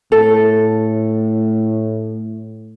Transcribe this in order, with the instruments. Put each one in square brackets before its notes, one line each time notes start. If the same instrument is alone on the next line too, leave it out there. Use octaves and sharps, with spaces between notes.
[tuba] A2 [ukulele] A4